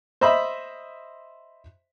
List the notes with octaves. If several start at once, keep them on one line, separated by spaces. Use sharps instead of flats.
C5 D#5 E5 B5